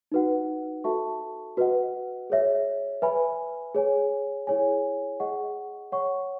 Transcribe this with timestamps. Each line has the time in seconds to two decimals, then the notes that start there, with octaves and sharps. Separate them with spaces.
0.12 D#4 F#4 B4 F#5
0.84 F#4 A4 E5 A5 C#6
1.57 F#4 B4 D#5 F#5
2.30 G#4 C#5 E5
3.02 B4 E5 G#5 B5
3.75 G#4 C#5 G#5
4.47 E4 G#4 C#5 G#5
5.20 G#4 D#5 F#5 C#6
5.92 C#5 F#5 C#6